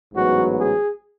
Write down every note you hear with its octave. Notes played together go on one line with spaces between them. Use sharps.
A1 G#2 F#3 B3 F#4
G#4